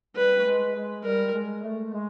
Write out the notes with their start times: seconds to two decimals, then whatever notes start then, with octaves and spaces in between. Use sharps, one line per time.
0.16 G3 B4
0.37 A3
0.45 G#3
0.75 G#3
1.04 G3 A#4
1.34 G#3
1.63 A3
1.93 G#3